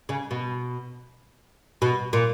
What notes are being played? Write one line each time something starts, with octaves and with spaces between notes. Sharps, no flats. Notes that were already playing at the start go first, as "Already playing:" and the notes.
C#3
B2
B2
A#2